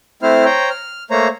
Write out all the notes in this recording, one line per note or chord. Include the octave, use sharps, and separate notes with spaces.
A3 C4 E4 C5 F6
C5 C#5 G5 A#5
F6
A3 A#3 C5 C#5 A#5